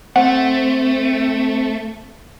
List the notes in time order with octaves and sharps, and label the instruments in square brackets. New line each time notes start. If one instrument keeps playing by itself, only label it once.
[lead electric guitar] A3 [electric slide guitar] C4 [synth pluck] F#5